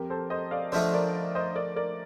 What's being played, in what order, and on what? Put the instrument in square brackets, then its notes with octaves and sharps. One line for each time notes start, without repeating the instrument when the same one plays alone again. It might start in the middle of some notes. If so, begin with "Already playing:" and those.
Already playing: [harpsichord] F2 [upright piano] G4 A#4
[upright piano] A4 C5
C5 D#5
D5 F5
[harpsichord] D3 F3 A3 D4 [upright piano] C5 D#5
[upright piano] A#4 D5
C5 D#5
A#4 D5
A#4 D5